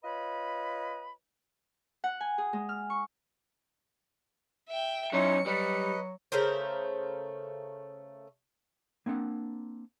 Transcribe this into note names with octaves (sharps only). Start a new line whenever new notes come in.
F4 B4 C#5 D#5 B5
F#5
G#5
G#4
G#3
F6
C#6
E5 G5
F#3 C#4 D#4 E4 C6 C#7
F#3 G3 B4 D#5
C#3 A3 A#4 C5
A#3 C4 D4 F#5